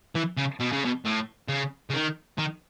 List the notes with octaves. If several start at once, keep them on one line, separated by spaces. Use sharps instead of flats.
E3
C#3
B2
C#3
B2
A2
C#3
C#3
D#3
D#3